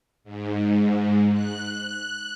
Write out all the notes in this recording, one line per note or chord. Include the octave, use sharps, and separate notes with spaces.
G#2
F#6